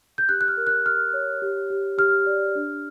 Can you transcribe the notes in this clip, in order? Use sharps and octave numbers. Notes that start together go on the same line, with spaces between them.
G6
G4 F#6
F#6
F6
A#4
F#6
G4 F6
C#5
G4
G4
G4 F6
D5
D4